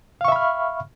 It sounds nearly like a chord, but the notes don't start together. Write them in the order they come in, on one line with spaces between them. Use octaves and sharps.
F5 C#6 E5 B5 F6